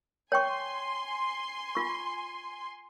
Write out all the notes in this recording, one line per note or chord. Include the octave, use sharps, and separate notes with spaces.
C#5 G5 G#5 C6 C#6
F4 C#6